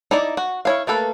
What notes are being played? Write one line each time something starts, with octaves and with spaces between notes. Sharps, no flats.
D#4 E4 D5
F#4
E4 C#5 F5
A3 A#3 A4 B4